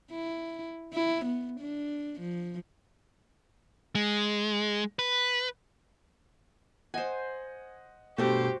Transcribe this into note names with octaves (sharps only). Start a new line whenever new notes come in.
E4
E4
B3
D4
F3
G#3
B4
C5 D#5 F#5 G#5
G2 B2 A3 F#4 G4 C5